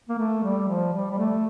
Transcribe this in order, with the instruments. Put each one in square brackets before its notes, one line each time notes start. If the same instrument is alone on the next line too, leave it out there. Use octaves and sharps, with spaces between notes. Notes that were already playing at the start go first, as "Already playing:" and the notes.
[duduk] A#3
A3
G3
F3
G3
G3
A3